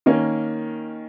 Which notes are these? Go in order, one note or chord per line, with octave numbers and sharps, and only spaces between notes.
D#3 A#3 C#4